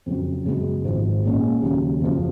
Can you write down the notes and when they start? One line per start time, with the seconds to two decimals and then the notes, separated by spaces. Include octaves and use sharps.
0.06 F2 C#3 F#3
0.45 F#2 C#3 G#3 B3 F#4
0.84 G#1 G#2 F3
1.24 A#2 G#3 C#4
1.62 D#2 C#3 F#3
2.01 F#1 F#2 C#3 F3